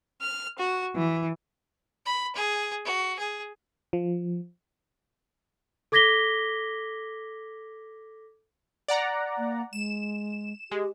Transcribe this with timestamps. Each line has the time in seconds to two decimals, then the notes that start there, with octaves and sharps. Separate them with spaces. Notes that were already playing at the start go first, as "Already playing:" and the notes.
0.21 F6
0.58 F#4
0.96 E3
2.06 B5
2.35 G#4
2.85 F#4
3.19 G#4
3.93 F3
5.92 A4 D6 G#6 A#6 B6 G7
8.88 D5 F#5 A#5
9.38 A#3
9.73 G#3 E7
10.71 G#3 G4